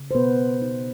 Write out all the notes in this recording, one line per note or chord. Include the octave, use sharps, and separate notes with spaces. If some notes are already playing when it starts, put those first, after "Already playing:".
Already playing: C#3
C5
B2 B3 B4
D#4